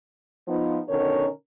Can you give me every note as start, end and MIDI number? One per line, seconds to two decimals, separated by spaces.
0.48 0.80 53
0.48 0.80 59
0.48 0.80 63
0.89 1.28 47
0.89 1.28 50
0.89 1.28 51
0.89 1.28 61
0.89 1.28 70
0.89 1.28 73